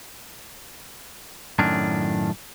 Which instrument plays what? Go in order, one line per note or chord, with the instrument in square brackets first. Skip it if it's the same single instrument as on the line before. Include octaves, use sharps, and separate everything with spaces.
[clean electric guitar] F#2 A2 D#3 C#4 D4